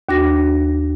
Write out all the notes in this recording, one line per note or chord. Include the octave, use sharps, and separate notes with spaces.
D#2 D4 F#4 A#6